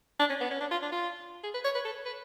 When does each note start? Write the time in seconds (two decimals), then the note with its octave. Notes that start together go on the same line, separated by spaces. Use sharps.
0.20 D4
0.30 C#4
0.41 B3
0.51 C#4
0.61 D4
0.71 F4
0.82 D4
0.92 F4
1.44 G#4
1.54 B4
1.65 C#5
1.75 B4
1.85 A4
2.06 B4